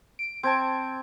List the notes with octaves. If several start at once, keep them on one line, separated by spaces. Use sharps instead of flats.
D7
C4 A5 G#6 D7